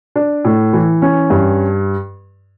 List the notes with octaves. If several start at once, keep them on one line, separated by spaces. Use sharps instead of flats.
D4
A2
E3
C#4
G2